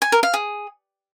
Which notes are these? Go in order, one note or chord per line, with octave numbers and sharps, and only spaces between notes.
G#5
A#4
F5
G#4